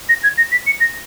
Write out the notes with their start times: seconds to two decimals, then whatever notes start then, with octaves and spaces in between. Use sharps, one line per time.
0.09 A#6
0.23 G#6
0.37 A#6
0.52 B6
0.66 C#7
0.80 A#6